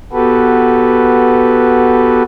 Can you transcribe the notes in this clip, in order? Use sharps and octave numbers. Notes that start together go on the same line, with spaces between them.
B3 F#4 G4 A4 B4